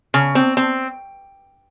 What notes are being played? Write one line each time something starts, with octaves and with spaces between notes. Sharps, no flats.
C#3
C4
C4